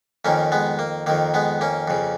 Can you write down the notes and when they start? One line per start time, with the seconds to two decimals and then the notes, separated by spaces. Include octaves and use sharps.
0.25 F2 D#3 A#3 C#4
0.52 G#3 B3
0.79 A#3
1.06 F2 D#3 A#3
1.34 G#3 B3
1.61 A#3 C#4
1.88 F2 C#3